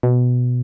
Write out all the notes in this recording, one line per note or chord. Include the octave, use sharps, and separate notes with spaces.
B2